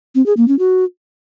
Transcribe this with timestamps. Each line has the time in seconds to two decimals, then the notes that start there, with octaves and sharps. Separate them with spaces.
0.15 C4
0.26 G#4
0.37 A#3
0.48 C#4
0.59 F#4